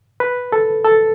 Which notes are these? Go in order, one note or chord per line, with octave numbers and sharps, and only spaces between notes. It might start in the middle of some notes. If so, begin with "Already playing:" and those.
B4
A4
A4